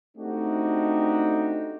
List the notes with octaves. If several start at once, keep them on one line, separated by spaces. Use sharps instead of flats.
A3 C4 D4 D#4 F#4 G4